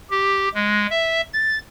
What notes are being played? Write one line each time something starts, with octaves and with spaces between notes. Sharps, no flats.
G4
G#3
E5
A6